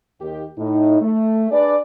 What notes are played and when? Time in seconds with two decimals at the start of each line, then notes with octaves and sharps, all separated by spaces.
0.21 D#2 D#3 G4
0.58 A2 D#4
1.01 A3
1.51 D4 G#4 B4 D5